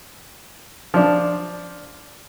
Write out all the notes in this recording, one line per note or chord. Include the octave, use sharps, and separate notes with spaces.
F3 D4